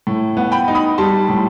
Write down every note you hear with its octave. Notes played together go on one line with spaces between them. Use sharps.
A2
B3
G5 B5
D#4
B5 D#6
G3 A5 C6
A2